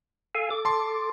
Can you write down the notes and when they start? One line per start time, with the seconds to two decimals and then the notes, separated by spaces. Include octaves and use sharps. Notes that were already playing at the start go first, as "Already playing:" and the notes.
0.35 A4 F5 G#5
0.50 A4 D6
0.65 A5 C6